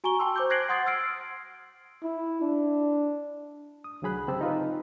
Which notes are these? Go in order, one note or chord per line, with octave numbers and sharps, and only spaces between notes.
F#4 G#5 A#5 C#6 G7
G5 A5 C6 E6
C5 D6 G6
F#6 G#6 A#6 C7 D7 F#7
F#5 C6 D#6 G#6 A6 C7
E6 F6 C7 D7
E4
D4
D#6
C2 D3 F#3 G#4 B5 F#6
C#3 C4 G4 A5 E6
D#4 F4 B4